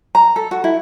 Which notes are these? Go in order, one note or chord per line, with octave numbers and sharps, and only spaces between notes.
A#5
A4
F#4
E4